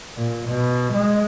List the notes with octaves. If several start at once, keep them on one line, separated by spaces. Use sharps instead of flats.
A#2
B2
G#3